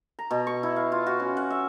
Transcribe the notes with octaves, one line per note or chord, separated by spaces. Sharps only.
A#5
B2
C#6
E4
F5
F4
F#4
C#4
F#5
E5